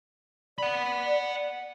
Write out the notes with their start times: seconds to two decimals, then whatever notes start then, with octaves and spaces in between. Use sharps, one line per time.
0.58 D5 F#5 B5